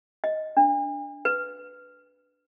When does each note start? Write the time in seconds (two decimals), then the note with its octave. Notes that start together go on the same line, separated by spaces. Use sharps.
0.24 D#5
0.57 D4
1.25 B4